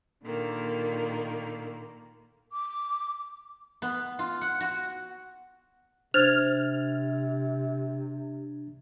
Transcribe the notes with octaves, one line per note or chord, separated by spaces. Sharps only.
A#2 D3 D#3 A#3
D6
B3
F4
F#5
F#4
C3 D4 C5 F6 G#6 A6